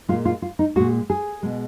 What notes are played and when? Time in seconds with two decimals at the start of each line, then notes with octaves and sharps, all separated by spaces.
0.09 A#2 G#3 F4
0.25 F4
0.42 F4
0.59 D#4
0.76 A#2 G#3 F#4
1.10 G#4
1.43 B2 G#3